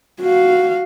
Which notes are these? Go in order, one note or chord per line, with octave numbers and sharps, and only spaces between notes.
F#4 F5